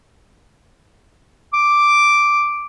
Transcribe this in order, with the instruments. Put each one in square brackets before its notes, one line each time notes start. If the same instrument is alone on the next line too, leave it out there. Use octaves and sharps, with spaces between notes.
[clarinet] D6